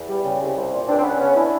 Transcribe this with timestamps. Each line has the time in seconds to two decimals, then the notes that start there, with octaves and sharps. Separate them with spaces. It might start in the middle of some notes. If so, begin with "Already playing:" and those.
Already playing: E2
0.08 G3
0.24 C#3
0.41 C2
0.56 C2
0.72 A#2
0.88 C#2 C4 D4
0.98 C4
1.04 C#2 B3 C#4
1.20 C#3 B3 C#4
1.36 D4 E4